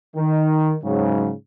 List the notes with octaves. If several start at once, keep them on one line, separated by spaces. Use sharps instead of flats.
D#3
G#2 C#3 F#3